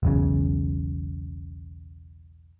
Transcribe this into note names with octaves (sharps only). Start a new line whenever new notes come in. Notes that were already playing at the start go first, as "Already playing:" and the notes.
E1 B1 C#3